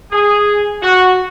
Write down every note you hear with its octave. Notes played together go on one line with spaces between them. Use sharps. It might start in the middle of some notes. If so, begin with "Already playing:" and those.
G#4
F#4